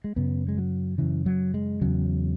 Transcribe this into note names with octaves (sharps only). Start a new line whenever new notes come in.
G#3
F#2 C#3 B3
G#3
F#3
F#2 C#3 E3
F#3
G#3
E2 C#3 F#3